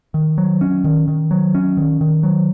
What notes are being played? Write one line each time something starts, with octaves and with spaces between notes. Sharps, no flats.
D#3
F#3
C#4
D#3
D#3
F#3
C#4
D#3
D#3
F#3